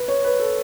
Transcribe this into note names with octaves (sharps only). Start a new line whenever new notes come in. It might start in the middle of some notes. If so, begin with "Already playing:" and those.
Already playing: B4
C#5
B4
A4